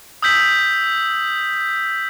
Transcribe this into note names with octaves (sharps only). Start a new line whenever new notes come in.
D#6 E6 G6 B6 F#7